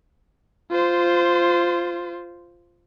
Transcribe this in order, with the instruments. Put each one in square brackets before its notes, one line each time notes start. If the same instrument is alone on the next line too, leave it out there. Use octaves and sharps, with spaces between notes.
[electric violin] F4 C5